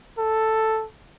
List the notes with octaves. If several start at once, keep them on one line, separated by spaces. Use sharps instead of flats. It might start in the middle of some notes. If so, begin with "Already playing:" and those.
A4